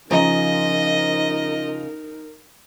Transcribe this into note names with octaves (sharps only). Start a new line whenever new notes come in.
C#3 F3 D#4 A#4 C5 D#5 A#5